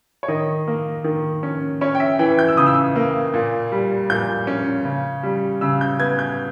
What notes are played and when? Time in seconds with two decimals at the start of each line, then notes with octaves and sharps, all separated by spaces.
0.23 C#5
0.28 D#3 D#5
0.68 A#3
1.04 D#3
1.43 C#4
1.81 C#4 C#5
1.95 G5
2.00 E5
2.19 E3 G5
2.39 G6
2.48 E6
2.57 C#3 D#6
2.67 E6
2.96 A#3
3.34 A#2
3.72 G3
4.10 A#2 G6
4.47 C#4
4.85 C#3
5.23 G3
5.61 C#3 E6
5.81 G6
5.99 B3 G#6
6.19 G6